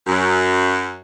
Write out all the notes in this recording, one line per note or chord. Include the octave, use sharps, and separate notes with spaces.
F#2